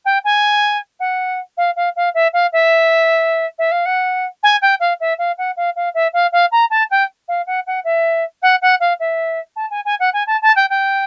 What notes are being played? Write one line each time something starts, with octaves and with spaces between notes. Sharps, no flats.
G5
G#5
F#5
F5
F5
F5
E5
F5
E5
E5
F5
F#5
G#5
G5
F5
E5
F5
F#5
F5
F5
E5
F5
F5
A#5
A5
G5
F5
F#5
F#5
E5
F#5
F#5
F5
E5
A5
G#5
G#5
F#5
G#5
A5
A5
G5
G5